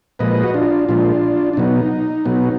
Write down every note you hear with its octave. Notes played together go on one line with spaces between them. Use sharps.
A#2 F3 G#3 B4 D#5
F#4
D4 F4
A#2 F3 G#3 D4 F4
D4
B2 F#3 B3 D#4
B2 F#3 B3